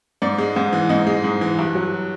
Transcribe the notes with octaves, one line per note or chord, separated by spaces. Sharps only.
G#2 D5
G#3
G#2
E3
G#2 D#5
G#3
G#2
E3
G2
F#3